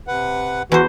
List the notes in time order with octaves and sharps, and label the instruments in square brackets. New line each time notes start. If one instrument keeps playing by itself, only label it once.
[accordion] C3 B4 F#5
[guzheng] E2 C5 [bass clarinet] E3 [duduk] F#4